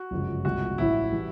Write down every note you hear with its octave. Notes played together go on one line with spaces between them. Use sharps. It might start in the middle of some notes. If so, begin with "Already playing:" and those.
Already playing: F#4
G1 F#2 C#3 F3 G#3
C2 A#2 F3 G#3 F#4
A1 A2 F3 E4
E3 G3